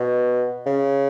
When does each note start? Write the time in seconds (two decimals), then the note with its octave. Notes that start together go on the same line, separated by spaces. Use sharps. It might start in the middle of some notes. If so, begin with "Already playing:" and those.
Already playing: B2
0.66 C#3